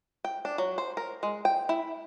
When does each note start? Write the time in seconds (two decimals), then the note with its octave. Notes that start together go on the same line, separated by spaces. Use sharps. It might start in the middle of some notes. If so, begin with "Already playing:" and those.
0.25 G5
0.45 D4
0.58 F#3
0.78 C5
0.97 A#4
1.23 G#3
1.45 G5
1.69 E4